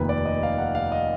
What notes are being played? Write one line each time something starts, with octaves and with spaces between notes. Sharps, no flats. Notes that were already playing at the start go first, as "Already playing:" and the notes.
Already playing: F1 D#2 D#3 B4
D5
D#5
F5
F#5
F5
D#5